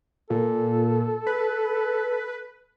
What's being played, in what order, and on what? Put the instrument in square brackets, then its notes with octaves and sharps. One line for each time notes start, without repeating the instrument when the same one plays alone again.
[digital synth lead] A#2 [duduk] A4
[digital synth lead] B4